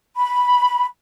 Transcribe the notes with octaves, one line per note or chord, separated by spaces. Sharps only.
B5